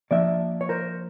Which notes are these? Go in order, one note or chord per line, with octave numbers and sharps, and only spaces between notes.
F3 A#3 D4 D5 E5
C#5
A#4 C5